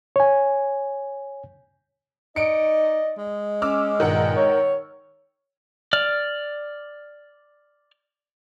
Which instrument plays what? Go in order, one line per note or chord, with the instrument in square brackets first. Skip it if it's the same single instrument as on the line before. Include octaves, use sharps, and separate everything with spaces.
[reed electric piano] C#5 G#5
[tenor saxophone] D#4 [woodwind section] D5 D#5 [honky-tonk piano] C#7 D7
[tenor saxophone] G#3
[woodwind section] C#4 [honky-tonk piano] D6 E6 F6
[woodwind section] G2 A#2 [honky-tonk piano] D#3 A#4 F#5
[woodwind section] C#5
[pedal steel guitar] D5 F6